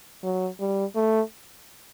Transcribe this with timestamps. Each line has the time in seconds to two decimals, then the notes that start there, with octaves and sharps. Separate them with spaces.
0.23 F#3
0.60 G3
0.96 A3